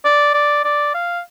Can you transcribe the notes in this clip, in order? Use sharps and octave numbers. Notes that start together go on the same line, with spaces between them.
D5
D5
D5
F5